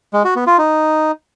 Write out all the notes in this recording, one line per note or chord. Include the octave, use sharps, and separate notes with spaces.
G#3
F#4
B3
F4
D#4